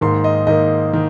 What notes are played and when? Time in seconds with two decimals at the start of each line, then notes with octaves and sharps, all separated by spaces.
0.01 G#2 D#3 A#3 C6
0.24 D#5
0.47 G#2 D#3 A#3 D#5
0.93 D#3